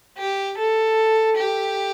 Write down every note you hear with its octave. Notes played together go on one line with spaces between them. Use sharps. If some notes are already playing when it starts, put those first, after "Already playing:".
G4
A4
G4